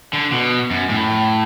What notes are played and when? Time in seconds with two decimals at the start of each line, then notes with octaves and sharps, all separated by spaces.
0.13 D3
0.32 B2
0.71 F#2
0.89 A2